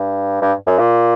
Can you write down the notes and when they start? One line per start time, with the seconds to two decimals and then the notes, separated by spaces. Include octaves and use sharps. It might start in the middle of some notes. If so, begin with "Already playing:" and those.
Already playing: G2
0.42 G2
0.67 F#2
0.79 A#2